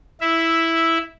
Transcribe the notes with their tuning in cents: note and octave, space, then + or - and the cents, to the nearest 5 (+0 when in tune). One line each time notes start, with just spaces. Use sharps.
E4 -5 E5 +0